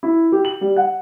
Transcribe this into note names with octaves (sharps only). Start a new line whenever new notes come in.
E4
G4
F#7
G3
F#5